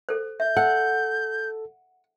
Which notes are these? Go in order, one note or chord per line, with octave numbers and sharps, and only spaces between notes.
A4 C5
E5 G6
A4 F#5